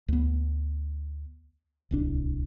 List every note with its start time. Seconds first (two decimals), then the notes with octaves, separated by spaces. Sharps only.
0.08 D2 B3
1.91 D1 C2 D4